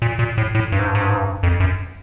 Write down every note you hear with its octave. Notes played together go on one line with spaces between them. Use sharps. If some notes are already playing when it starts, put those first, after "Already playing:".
A#2
A#2
A2
A2
G2
G#2
G2
G#2
G2
G#2
G2
F2
F#2